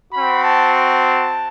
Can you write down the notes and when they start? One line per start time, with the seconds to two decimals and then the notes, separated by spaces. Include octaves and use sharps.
0.12 C4 F#4 B5
0.42 A5
0.74 A5